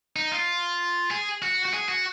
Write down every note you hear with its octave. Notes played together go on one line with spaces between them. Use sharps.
D#4
F4
G#4
F#4
F#4
G#4
F#4